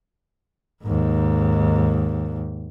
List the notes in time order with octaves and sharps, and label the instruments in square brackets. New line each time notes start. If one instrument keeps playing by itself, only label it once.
[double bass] D#2 G#2